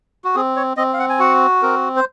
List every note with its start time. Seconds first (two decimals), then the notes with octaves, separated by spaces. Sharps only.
0.24 F#4
0.35 C4 G#4
0.56 C#5
0.77 C4 D#5
0.93 F5
0.99 F#5
1.09 G#5
1.19 F#4 F#5
1.63 C4 A#4
1.96 C5